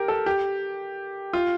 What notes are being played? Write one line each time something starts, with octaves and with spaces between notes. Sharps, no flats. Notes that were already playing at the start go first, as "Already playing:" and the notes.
Already playing: G4 A#4
A4
G4
F4